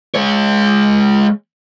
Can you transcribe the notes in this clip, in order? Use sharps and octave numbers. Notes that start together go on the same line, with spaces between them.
G#3 C#5